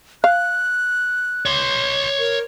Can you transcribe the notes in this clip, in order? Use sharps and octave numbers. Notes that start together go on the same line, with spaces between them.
F5 F#6
C#5 C6
A#4